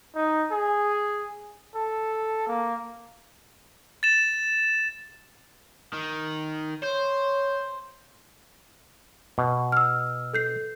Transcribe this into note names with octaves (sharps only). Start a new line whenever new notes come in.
D#4
G#4
A4
A#3
A6 E7
D#3
C5 C#5
B2
E6 F6
A4 G6 C7